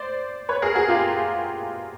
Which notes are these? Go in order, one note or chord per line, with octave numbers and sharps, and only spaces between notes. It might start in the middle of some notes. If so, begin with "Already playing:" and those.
Already playing: C5 D5
B4 C#5
G#4 A#4
F#4 G#4
F4 G4